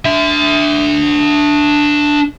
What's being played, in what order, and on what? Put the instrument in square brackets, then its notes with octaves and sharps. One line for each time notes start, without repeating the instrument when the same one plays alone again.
[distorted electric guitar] D4 E5